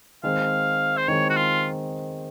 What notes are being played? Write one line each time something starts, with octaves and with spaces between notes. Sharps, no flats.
D#3 G#3 C4 F5
C5
D#3 G#3 C4 C#5
F#4
F4